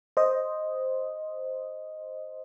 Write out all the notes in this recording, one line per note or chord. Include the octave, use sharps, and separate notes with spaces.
C5 D#5